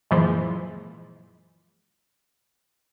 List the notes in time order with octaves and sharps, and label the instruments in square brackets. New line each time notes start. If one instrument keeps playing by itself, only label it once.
[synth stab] F#2 A#2 E3 F3 G#3